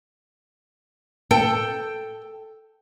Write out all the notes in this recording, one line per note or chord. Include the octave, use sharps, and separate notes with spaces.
A4 G5